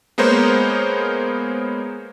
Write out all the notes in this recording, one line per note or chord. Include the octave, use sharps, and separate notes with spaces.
G#3 A#3 B3 A#4 C5 C#5